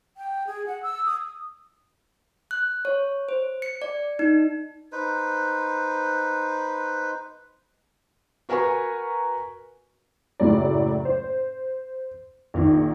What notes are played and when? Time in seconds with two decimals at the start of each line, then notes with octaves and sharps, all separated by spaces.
0.17 G5
0.47 G#4
0.66 F#5
0.83 E6
1.05 D#6
2.51 F#6
2.85 C#5
3.29 C5
3.62 C#7
3.82 D5
4.19 D#4
4.92 D#4 B4 C5
8.49 F#4 A#4 B4 G#5 A#5 C#6
10.40 F#1 A2 F#3 D5
11.05 C5
12.54 A#1 D#3